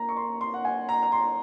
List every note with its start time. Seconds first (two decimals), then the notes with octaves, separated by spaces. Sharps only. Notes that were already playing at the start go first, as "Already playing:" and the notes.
Already playing: A#3 A#5
0.09 C#6
0.17 C6
0.41 C6
0.54 F#5
0.65 G#5
0.89 A#5
1.03 A#5
1.12 C6